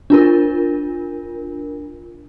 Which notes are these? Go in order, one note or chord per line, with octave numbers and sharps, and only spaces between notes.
D4 F4 A#4